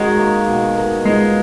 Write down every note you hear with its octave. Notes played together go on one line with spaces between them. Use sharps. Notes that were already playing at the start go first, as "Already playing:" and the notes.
Already playing: D#3 G#3 C#4 D#4 F#4
A#3
B2
A#4
G#3 F4